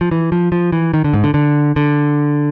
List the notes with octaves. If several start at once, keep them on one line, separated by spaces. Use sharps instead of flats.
F3
E3
F3
F3
E3
D#3
D3
G#2
D3
D3
D3